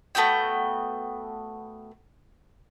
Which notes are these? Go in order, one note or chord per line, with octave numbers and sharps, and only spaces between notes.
A3 B3 F#4 G5